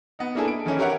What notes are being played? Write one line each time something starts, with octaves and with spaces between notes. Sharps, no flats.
B3 D#4
A#3 D4 E4 G#4 A4
D7
D#3 E3 C#4 E4
G4 A#4 C#5 E5 F#5